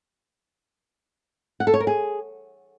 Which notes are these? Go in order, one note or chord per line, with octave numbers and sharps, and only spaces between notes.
F#5
A4
C#5
A#4
G#4